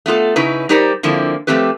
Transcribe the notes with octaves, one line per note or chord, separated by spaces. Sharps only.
A3 B3 F4 A4
C#3 C#4 D#4 E4 B4
G3 D#4 G4 A#4 C5 D5
D3 F3 A#3 C4 E4
F3 G#3 A3 C4 G4 B4